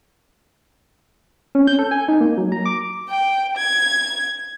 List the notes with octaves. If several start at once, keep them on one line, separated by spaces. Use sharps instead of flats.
C#4
G6
A4
G#5
D#4
A#3
F#3
A#5
D6
G5
G#6